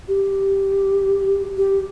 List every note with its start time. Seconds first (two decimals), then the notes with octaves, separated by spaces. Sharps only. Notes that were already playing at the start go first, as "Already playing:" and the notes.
0.08 G4
1.58 G4